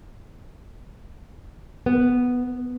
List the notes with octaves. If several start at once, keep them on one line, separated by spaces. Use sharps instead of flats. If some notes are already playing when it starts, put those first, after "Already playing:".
B3